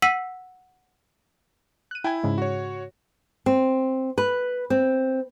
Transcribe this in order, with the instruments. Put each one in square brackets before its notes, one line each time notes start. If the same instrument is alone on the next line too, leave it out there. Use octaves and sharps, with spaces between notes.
[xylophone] F#5 E6 B6 D#7 F#7
[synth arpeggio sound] F#6 D#7
[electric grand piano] E4 [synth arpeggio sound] G5 G#5
[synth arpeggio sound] G#2 C#3 G#3
[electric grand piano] F#4 C#5
[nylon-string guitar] C4
B4
C4